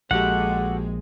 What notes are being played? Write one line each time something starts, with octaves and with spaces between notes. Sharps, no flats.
A#1 G#3 F#4 G4 A4 F#5